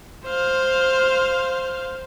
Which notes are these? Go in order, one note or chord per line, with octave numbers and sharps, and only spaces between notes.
C5 F5